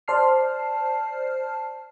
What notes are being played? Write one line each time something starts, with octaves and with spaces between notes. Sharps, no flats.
C5 D5 A5 F6 C7